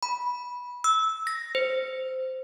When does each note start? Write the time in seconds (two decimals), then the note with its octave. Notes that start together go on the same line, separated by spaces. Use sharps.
0.03 B5
0.84 E6
1.27 A#6
1.55 C5